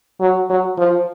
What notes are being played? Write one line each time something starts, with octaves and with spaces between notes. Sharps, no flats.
F#3
F#3
F3